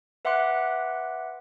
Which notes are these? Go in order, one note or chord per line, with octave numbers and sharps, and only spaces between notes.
B4 E5 F#5 C6 D6 F#6